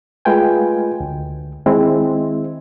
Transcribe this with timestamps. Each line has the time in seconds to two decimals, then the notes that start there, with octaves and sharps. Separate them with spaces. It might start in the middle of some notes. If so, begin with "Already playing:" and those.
0.25 G#3 A3 F4 B4 G5 G#5
1.00 D2
1.66 D#3 G#3 C4 E4